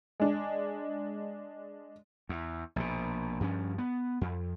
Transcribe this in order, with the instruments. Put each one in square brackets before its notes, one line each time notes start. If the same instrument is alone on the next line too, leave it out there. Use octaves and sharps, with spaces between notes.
[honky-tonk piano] G#3 D4
[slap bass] E2
A#1 B2
G2 F3 C#4
B3
F2